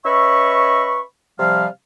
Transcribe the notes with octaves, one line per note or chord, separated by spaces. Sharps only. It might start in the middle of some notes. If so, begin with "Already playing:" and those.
C#4 B4 D#5 E5 B5 C#6
C3 F3 G3 F5